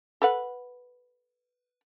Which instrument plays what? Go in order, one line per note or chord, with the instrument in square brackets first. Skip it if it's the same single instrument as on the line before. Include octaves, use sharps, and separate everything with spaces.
[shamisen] A4 B4 F#5